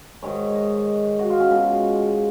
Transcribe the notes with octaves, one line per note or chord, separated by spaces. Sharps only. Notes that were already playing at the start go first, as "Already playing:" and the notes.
G#2 D#3 G#3 C#5
D#5
F#4
F4
C#4
B2 G#3